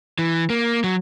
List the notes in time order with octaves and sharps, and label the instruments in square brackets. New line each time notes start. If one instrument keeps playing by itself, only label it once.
[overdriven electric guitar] E3
A#3
F#3